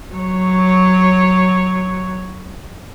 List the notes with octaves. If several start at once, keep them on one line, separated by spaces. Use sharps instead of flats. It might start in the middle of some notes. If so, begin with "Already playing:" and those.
F#3 C#5